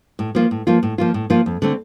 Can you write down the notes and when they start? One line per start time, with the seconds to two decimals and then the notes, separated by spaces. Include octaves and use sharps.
0.19 A2
0.35 F3 A#3 F4
0.51 A2
0.67 F3 A#3 F4
0.83 A2
0.98 F3 A#3 F4
1.14 A2
1.30 F3 A#3 F4
1.46 F2
1.62 D3 A3 C4